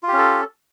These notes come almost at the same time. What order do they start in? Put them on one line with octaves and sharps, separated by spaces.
F4 G4 C#4 A4